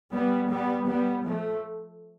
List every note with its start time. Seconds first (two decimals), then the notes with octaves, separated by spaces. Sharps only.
0.13 G3 B3
0.50 G3 B3
0.88 G3 B3
1.26 F3 A3